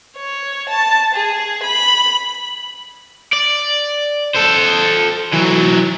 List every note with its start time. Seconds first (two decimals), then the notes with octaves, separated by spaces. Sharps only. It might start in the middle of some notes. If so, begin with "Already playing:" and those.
0.16 C#5
0.70 A5
1.15 G#4
1.63 B5
3.33 D5
4.35 A4 C5
5.33 E3 F#3